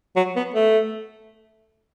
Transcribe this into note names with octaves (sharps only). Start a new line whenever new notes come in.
F#3
B3
A3